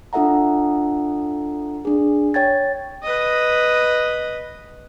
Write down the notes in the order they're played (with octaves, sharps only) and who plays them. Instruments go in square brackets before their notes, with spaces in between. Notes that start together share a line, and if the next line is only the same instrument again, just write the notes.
[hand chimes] D4 F4 A4 E5 F#5 A#5
D4 G#4
C#5 G5 G#6 A6
[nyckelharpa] B4 D#5